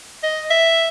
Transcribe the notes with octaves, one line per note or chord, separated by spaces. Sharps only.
D#5
E5